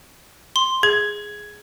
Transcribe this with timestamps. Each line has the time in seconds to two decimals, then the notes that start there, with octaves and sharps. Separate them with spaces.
0.56 C6
0.83 G#4 G#6